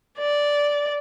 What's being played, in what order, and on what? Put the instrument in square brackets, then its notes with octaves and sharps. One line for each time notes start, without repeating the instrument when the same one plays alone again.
[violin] D5